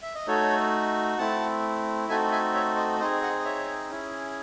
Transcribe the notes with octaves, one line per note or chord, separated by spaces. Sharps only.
E5
D#5
A3 D#4 F#4 A4 C#5
A3 C4 E4 F#5 A5
A3 C4 D#4 F#4 A4 E5 G#5
E5 G#5
C#5 E5
C5 D#5
C4 D#4 G#4 C5 D#5
D#5 F#5
D#5
C#5 E5
C#4 E4 G#4